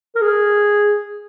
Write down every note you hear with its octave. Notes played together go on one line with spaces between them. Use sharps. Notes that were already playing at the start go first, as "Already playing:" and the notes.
A#4
G#4